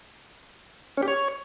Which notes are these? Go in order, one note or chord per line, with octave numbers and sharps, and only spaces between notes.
C#4
G4
C#5